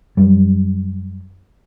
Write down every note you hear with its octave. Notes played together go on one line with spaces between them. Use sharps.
F#2 G3